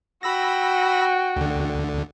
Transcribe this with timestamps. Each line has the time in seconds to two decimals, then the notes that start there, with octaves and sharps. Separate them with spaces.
0.23 F#4 G5 B5 E6 A#6
1.36 D2 D3